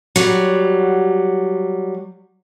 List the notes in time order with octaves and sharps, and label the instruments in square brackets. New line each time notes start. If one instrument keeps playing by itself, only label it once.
[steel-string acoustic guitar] F#3 G3